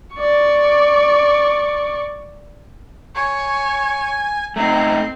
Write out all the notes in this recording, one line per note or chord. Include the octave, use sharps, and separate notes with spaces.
D5 C#6
C#5 G#5
A3 C4 D#4 A#5